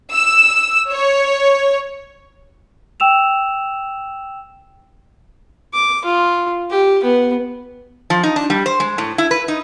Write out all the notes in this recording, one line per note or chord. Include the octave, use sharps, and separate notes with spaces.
E6
C#5
G5 E6 E7 F7
D6
F4
G4
B3
F3
D#4
D4
G3
C5
G#3
A2
E4
B4
D#4